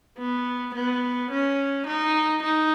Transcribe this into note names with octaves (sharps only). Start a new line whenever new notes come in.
B3
B3
C#4
D#4
D#4